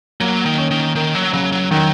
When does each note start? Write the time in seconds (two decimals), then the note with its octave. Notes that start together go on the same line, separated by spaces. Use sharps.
0.21 F#3 A#3
0.46 D#3
0.58 C#4
0.71 D#3
0.95 D#3 A#4
1.15 F#3
1.33 C#3 F#3
1.52 F#3
1.71 D#3 F#3